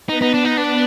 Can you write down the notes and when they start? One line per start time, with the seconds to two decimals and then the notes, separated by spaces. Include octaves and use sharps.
0.09 B3 D#4 B4
0.22 D#4
0.34 D4
0.45 D#4
0.57 D4